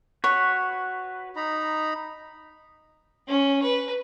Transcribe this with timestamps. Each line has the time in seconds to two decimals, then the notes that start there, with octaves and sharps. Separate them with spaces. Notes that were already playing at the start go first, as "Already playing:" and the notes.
0.24 F#4 B4 C#5
1.36 D#4 A#5 B5
3.27 C#4
3.62 B4